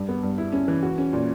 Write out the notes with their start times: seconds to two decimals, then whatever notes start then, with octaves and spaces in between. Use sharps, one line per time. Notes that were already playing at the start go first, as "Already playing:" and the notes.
Already playing: G2
0.09 B3
0.23 G2
0.38 E4
0.53 C#4
0.68 E3
0.83 F#4
0.98 C#4
1.13 A#2